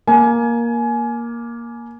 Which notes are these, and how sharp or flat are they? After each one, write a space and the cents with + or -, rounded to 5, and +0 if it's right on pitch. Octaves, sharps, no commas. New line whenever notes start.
A#3 +10 G#5 +25